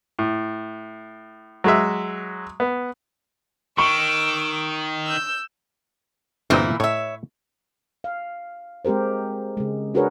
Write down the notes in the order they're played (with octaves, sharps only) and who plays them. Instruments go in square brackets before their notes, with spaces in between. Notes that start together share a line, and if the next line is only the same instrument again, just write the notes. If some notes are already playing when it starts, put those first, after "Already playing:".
[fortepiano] A2
F#3 G#3 E5
B3
[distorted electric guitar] D#3 [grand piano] C#6 [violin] D6 E6
[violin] E6 G6
[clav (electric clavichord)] G1 C4 D#5 [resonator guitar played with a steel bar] A#2 E3 E4
[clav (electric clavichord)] A2 [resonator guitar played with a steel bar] C#5 E5
[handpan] F5
G#3 C4 G4 A#4 C5
C#3 G#3
D4 F#4 G#4 A#4 B4 C#5